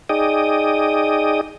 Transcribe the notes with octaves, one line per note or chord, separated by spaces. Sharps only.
D#4 G#4 D5 D#5 G5 D#6